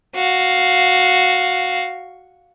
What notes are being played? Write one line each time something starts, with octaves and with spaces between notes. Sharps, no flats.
F#4 F5